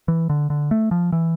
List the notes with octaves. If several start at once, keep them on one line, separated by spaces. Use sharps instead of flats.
E3
D3
D3
A3
F3
E3